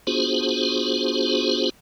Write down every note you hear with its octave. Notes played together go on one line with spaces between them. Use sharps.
B3 D4 F4 F#4 G#4 C5